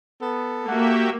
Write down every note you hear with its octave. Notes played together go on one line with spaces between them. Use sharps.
B3 A4
A#3 F#4 G4 E5 F#5